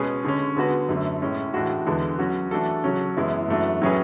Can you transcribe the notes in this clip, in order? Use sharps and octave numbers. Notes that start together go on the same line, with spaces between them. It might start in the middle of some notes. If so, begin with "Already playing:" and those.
Already playing: B2 G#3 C#4 G#4 B4
D3 G#3 C#4
D3 G#3 B3 F#4 B4
F#2 D3 A3
A2 G#3 C#4
A2 E3 G#3 D4 F#4
E2 D3 G#3 B3
F#3 C#4 F#4
E3 A3 D4 F#4 A4
C#3 F#3 C#4
F#2 E3 G#3 B3 E4
F#2 E3 A3 D4 F#4
A2 F#3 C#4 G#4 B4